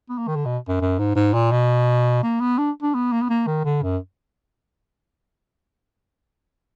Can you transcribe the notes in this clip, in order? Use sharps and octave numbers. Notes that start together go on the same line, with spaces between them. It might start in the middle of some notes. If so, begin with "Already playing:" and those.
B3
A#3
D#3
D3
B2
F#2
F#2
G#2
G#2
A#2
B2
A#3
B3
D4
D4
B3
A#3
B3
A#3
D#3
D3
F#2